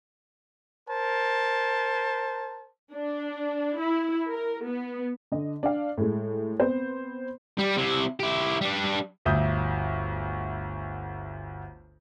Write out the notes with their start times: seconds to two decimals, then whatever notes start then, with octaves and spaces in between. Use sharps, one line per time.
0.89 A#4 C5 A5
2.94 D4
3.79 E4
4.30 A#4
4.67 B3
5.32 D3 D#5
5.63 D4 F5
5.98 A2 G#3
6.60 B3 C4 C5
7.59 G3
7.78 C3 E4
8.20 E4 G4
8.61 G3 D4
9.25 G1 D2 E5 D#6 G6